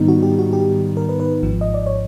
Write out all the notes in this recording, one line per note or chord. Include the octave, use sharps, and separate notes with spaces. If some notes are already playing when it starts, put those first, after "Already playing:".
Already playing: G#2 D#3 G3 B3 D#4
F#4
G4
F#4
G4
A#4
B4
B4
G#1 G#2 F3
D#5
D5
C#5